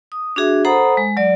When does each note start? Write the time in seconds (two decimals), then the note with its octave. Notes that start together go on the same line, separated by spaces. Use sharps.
0.12 D#6
0.36 D4 F#4 G#4 E5
0.65 A4 C5 F#5 A#5 B5 D#6
0.97 G#3
1.17 F#3 D5